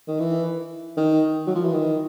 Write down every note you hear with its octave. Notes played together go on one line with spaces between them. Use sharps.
D#3
E3
D#3
F#3
F3
E3
D#3